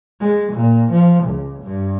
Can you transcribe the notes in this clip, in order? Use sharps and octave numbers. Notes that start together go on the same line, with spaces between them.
G#3
A#2
F3
C#2
G2